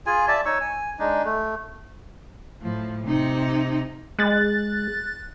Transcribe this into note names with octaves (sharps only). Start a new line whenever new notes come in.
F4 G#4 G#5
D5 E5 A5
D#4 C#5 C#6 E6
G#5
G#3 D4 D#4
A3
A2 F3
C3 D#4
G#3 F#6 A6